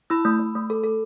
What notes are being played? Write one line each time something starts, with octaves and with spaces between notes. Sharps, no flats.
E4 B5 E6
A3
A3
A3
A4
A4